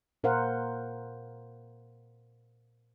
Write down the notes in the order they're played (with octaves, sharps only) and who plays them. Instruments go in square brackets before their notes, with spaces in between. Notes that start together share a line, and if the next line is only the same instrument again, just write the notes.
[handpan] A#2 A#4 C5 F5 F#5